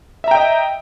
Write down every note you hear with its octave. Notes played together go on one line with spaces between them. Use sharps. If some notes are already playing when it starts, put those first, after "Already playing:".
D#5 E5 G5 A#5